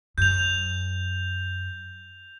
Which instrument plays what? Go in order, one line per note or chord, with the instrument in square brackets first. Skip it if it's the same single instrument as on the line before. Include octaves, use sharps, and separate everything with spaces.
[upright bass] F#2 [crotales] G6 F7